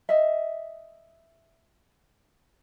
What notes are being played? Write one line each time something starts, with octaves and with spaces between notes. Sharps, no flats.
D#5 E5